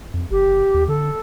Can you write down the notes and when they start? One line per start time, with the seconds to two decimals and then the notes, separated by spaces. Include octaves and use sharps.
0.14 F2
0.31 F#1 G4
0.74 D#2
0.88 D3 A4